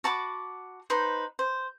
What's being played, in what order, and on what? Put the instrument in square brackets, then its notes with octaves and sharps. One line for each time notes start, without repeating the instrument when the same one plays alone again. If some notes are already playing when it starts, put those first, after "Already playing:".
[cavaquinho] F#4 A5 B5 D6
D#4 B4 C5
C5